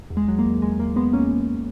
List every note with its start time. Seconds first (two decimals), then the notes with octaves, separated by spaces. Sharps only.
0.10 E2
0.17 G#3
0.28 F#3
0.39 A#3
0.45 E2
0.62 E2 G#3
0.79 E2 A#3
0.96 E2 G#3 B3
1.13 E2 A#3 C#4
1.31 E2